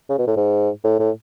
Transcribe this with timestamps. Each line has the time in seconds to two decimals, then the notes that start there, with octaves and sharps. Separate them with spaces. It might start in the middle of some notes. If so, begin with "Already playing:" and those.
0.09 C#3
0.19 B2
0.27 A2
0.36 G#2
0.84 A2
0.99 A2